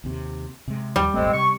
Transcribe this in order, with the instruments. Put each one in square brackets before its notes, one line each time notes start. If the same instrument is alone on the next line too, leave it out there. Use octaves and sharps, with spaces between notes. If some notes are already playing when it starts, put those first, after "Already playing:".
[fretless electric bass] D#2 C3
C3 G#3
[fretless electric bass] D#2 [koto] G3
[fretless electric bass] D#1 G#1 A3 [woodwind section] G#3 C4
[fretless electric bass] C3 [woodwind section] C#6